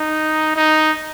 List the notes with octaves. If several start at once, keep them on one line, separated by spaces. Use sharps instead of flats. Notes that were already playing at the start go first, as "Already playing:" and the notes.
Already playing: D#4
D#4